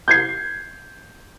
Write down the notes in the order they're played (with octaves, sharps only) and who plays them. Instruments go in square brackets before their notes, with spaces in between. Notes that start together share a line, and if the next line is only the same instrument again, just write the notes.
[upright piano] G6 G#6 C7